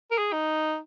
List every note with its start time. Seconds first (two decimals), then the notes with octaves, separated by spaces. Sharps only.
0.11 A#4
0.18 G#4
0.32 D#4